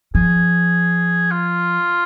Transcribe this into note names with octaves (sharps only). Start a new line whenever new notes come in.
F3 G#4
F4